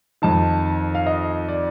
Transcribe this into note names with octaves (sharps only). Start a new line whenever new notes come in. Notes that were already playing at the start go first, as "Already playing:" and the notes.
F2 D#3 A5
F5
D#5
D5